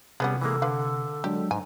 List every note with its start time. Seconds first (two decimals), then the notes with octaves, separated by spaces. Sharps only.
0.20 C3 G3 A3 B3 C#4 F#4 G#4
0.41 E3 G#3 A#3 A4
0.62 D3 B4 F5
1.24 F#3 G#3 D4 G4
1.51 G#2 G#5